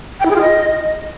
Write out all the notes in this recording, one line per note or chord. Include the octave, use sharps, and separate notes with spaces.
G5
E4
G#4
F4
D#5